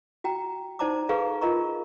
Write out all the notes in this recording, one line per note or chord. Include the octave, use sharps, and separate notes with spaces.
F#4 G5 A#5
D#4 C5 D5 A5 A#5 D6
G#4 A4 B4 F5 A#5 C#6
F4 A#4 D#5 A#5 C#6